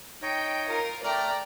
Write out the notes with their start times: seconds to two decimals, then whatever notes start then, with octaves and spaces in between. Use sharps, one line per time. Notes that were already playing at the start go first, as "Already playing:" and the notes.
0.22 D#4 C#5 D#5 G5
0.67 F4 A#4
1.04 A3 D5 G5 A#5 F6